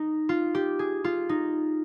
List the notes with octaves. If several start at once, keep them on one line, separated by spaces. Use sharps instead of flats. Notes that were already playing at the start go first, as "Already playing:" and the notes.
Already playing: D#4
F4
G4
G#4
F4
D#4